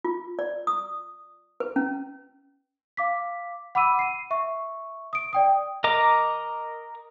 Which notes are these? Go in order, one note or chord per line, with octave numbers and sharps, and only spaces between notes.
F4
D5
D#6
B4
C#4
F5 D6 B6
F#5 B5 D6 E6 D#7
C7 D#7
E5 C#6
D#6 D7
D5 G5 D#6
A#4 D#5 A#5 D6